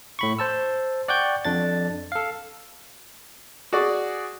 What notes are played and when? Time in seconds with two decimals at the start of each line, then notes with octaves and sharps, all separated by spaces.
0.19 A2 B5 C#6
0.39 C5 A5 E6
1.08 D5 F#5 G5 C#6 G6
1.45 F2 D4 A6
2.12 A4 F5
3.73 F#4 G#4 D5